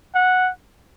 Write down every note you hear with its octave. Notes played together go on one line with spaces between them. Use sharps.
F#5